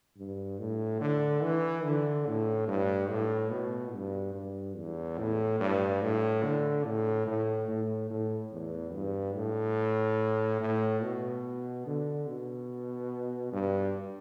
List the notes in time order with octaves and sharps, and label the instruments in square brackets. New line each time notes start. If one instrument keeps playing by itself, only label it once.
[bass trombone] G2
A2
D3
E3
D3
A2
G2
A2
B2
G2
G2
E2
A2
G2
A2
D3
A2
A2
A2
A2
E2
G2
A2
A2
B2
D3
B2
G2